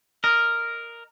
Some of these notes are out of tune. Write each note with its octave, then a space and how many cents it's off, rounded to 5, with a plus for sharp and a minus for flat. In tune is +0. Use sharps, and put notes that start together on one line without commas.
A#4 +0 D#5 +0